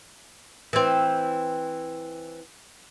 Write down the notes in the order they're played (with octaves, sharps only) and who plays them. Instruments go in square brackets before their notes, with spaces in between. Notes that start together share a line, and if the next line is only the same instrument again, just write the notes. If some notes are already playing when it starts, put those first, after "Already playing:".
[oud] E3 C4